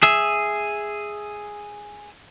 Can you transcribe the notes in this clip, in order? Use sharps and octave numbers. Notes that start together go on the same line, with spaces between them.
G#4 E5